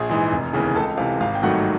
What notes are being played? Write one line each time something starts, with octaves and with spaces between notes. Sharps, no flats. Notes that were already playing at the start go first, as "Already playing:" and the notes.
Already playing: A#1 G#4 G#5
G#2 E3
F1
D#2 C#3 E3
C#2 A4 A5
C3 E3 F5
G#1 F5
G5
G2 D#3 F#3 A3 F#4 F#5